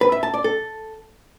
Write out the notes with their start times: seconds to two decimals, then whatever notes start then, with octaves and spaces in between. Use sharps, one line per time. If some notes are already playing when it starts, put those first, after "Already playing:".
0.01 B4
0.12 E5
0.23 A5
0.34 D5
0.44 A4